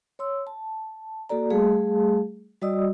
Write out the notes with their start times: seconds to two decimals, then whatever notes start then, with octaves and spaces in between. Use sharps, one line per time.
0.19 C#5 C6 E6
0.47 A5
1.29 A#3 F#4 A4 D5 A#5
1.50 G3 A3 G#4 F5 A5
2.62 G3 F#4 D5 D#5 D#6 E6